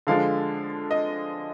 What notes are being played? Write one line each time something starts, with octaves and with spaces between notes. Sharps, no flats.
D3 F3 G#3 D4 F5
D#5